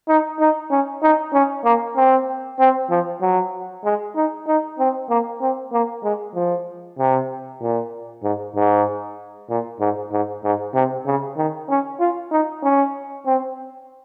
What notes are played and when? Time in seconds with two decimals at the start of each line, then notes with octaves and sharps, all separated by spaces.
0.09 D#4
0.40 D#4
0.71 C#4
1.02 D#4
1.33 C#4
1.65 A#3
1.97 C4
2.59 C4
2.90 F3
3.21 F#3
3.85 G#3
4.16 D#4
4.47 D#4
4.79 C4
5.10 A#3
5.41 C4
5.73 A#3
6.04 G#3
6.35 F3
6.99 C3
7.62 A#2
8.23 G#2
8.55 G#2
9.50 A#2
9.80 G#2
10.12 G#2
10.44 G#2
10.74 C3
11.06 C#3
11.37 D#3
11.69 C#4
12.00 F4
12.32 D#4
12.63 C#4
13.26 C4